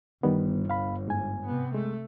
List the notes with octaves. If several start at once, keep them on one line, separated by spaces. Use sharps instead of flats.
G1 D#3 G3 B3
C2 F5 B5
G#2 G#5
C3 B3
G#3 A3